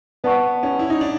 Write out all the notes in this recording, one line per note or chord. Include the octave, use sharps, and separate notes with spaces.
B3 B4 D5 F#5 A5 C#6
C#4
E4
D#4
D4